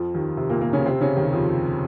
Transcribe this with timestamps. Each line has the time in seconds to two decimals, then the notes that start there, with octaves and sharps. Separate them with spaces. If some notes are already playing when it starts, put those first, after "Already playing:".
Already playing: F2 F3
0.14 D#2 D#3
0.37 C3
0.50 A#2 A#3
0.61 A#2 A#3
0.73 C#3 C#4
0.86 C3 C4
1.01 C#3 C#4
1.17 D#2 D#3
1.33 F2 F3